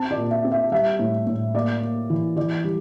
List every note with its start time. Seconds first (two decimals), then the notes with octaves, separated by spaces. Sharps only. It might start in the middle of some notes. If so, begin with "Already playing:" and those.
Already playing: C4 A5
0.11 D5
0.17 A#2
0.31 E5
0.44 C4
0.52 E5
0.72 G3 E5
0.99 A2
1.27 A2
1.54 A#3 D5
1.82 A#3
2.10 E3
2.37 E3 D5
2.64 G3